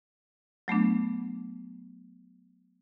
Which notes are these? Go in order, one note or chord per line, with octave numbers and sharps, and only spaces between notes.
F#3 A3 B3 D4